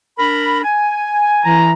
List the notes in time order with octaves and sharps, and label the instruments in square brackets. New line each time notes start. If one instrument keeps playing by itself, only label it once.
[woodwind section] D4 A#4 B5
G#5
[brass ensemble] E3 A#5